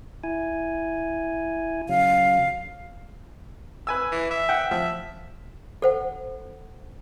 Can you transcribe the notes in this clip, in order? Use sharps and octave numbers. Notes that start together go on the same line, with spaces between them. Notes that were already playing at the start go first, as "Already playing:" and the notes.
E4 G#5
C#3 F#3 F5
B4 G#5 E6
E3
E5
F#5 G5
F3 E5
A4 C5 F#5